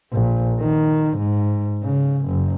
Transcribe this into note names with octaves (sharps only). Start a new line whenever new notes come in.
A#1
D#3
G#2
C#3
F#1